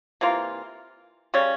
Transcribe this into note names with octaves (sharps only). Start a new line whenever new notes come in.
C3 E3 A#3 F4
C#3 G3 C#4